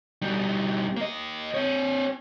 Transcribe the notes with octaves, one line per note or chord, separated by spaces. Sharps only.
B2 G3
A#3 D#5
C4 C#5